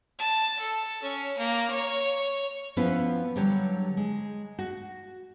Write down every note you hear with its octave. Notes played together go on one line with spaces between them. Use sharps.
A5
A4
C#4
A#3
C#5
F3 B3 C#4 E4 B4
D3 F#3 G3 G4 C#5
G#3
F#4